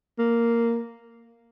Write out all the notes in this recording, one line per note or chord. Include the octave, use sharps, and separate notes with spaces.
A#3